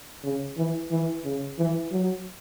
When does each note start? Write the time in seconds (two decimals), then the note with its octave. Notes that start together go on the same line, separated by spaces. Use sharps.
0.24 C#3
0.57 E3
0.91 E3
1.24 C#3
1.58 E3
1.92 F#3